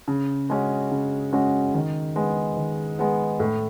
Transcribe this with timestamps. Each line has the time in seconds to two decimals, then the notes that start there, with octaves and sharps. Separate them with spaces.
0.08 C#3
0.50 G#3 C#4 F#4
0.91 C#3
1.33 G#3 C#4 F#4
1.74 D#3
2.16 G#3 B3
2.57 D#3
2.99 G#3 B3
3.40 A2